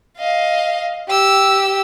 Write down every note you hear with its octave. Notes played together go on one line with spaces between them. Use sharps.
D#5 F5
G4 E6